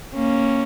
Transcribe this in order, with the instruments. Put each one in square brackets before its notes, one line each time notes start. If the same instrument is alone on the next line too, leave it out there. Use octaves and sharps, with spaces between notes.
[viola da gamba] A#3 C#4